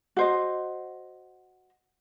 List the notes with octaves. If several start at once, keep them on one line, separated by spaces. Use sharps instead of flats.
F#4 C5 D#5